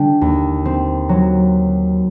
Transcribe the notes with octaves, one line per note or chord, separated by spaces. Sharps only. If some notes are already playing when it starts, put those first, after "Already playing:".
Already playing: D3 G3 G5
D#2
C4
F#3